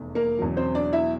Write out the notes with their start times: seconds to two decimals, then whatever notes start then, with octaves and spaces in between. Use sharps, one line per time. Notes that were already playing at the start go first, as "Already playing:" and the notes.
Already playing: F1 E2
0.15 A#3 A#4
0.39 E1 E2 C#3 F#3
0.57 C4 C5
0.75 D4 D5
0.93 E4 E5